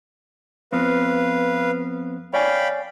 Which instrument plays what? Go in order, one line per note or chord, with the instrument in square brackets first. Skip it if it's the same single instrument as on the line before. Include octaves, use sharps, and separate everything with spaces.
[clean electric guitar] F2 B3 C4 [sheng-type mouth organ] B4 F5
[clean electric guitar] C#5 D5 G#5 [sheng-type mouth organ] F5 G5 B5